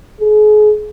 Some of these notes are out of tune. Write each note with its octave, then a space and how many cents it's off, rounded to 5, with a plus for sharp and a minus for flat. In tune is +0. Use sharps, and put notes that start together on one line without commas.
G#4 +35